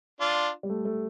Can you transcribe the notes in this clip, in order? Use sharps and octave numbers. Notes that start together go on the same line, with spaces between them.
D4 F4
G3
A3
A3